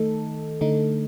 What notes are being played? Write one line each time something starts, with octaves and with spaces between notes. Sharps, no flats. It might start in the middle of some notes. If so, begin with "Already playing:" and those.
Already playing: D#3 A3 D#4 A4
D3 A3 D#4